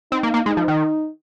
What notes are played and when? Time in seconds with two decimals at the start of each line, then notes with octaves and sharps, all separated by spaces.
0.11 C4 D#4
0.23 A#3
0.34 A#3
0.45 G#3 D#4
0.57 F3
0.68 D#3